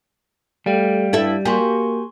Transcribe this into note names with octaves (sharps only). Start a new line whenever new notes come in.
G3 A3 F5 G5
G2 E4 A4 E5
A#3 F#4 G4 G#5 C6 C#6